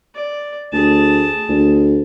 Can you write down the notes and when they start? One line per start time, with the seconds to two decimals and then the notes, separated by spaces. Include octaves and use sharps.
0.16 D5
0.73 D2 G#4 A5
1.49 D2